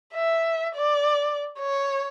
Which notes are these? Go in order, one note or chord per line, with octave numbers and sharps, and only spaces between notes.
E5
D5
C#5